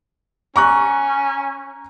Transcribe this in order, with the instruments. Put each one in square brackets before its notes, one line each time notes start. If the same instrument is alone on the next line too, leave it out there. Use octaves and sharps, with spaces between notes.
[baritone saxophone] C#4 [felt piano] A#5 C#6 F#6